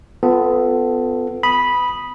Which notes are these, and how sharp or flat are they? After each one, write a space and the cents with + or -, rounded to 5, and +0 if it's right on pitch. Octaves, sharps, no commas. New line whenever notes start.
B3 +25 F4 +0 A4 +5
B5 -10 D#6 +0